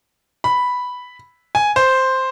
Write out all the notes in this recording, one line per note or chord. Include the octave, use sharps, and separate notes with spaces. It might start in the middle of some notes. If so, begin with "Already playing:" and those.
B5
G#5
C5